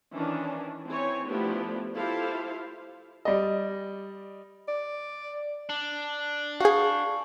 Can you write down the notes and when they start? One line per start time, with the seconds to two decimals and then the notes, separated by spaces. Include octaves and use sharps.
0.14 D#3 E3 C#4 D4
0.87 E3 C4 E4 C#5 G#5
1.27 F3 A3 B3 D4 E4 G4
1.95 E4 F4 G4 A4 C5 F5
3.25 G3 D5 D#5
4.68 D5
5.69 D4
6.60 F#4 G#4 F5 C#6 G6